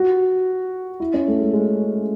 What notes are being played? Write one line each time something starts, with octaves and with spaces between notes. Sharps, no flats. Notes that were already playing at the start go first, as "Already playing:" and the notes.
Already playing: F#4
E4
C#4
A3
G#3
G#3